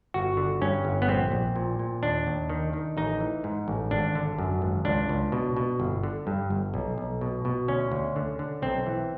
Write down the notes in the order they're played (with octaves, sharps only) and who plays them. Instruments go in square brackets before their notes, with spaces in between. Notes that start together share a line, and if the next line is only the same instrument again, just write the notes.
[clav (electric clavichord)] G1 F#4
D3
G2 C#4
G1
B3
A#1 C4
A#1
A#2
A#2
D#2 D4
D#2
D#3
D#3
A1 D#4
E3
G#2
A1
G#1 D4
D3
F#2
G#1
C#2 D4
C#2
B2
B2
G1
D3
G2
G1
B1
B1
B2
B2
D2 C#4
D2
D3
D3
B1 C4
E3